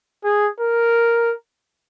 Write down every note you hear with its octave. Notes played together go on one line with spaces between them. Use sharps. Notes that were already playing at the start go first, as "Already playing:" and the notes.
G#4
A#4